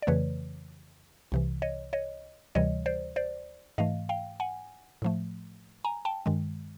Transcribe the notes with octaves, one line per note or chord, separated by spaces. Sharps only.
D5
F2 C#3 E3 A3 B4 C#5
C2 C3 E3
C#5 D#5
C#5 D#5
D2 C3 E3 G3 C#5 D#5
C5 D5
C5 D5
G#2 E3 A3 D#5 F5
F5 G5
F#5 G#5
A2 F3 A3
G#5 A#5
G5 A5
G2 D#3 G#3